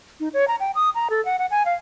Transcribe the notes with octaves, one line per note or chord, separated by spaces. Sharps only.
D#4
C#5
A#5
G5
D#6
A#5
A4
F#5
F#5
G#5
F5